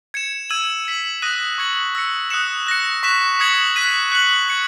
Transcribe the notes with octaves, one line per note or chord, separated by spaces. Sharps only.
G#6 C#7 E7
E6 G#6 D#7 F#7
E6 B6 F#7
D#6 F#6 A#6 D#7
C#6 G#6 C#7 F#7
E6 A#6 C#7
D#6 F#6 C#7 E7
F#6 A#6 C#7
C#6 F#6 B6 E7
D#6 G#6 C#7 F#7
F#6 B6 D#7
F#6 C#7 F#7
G#6 C#7 F#7